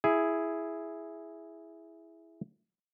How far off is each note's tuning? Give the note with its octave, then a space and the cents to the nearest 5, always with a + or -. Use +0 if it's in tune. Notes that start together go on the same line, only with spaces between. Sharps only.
E4 +0 G#4 +0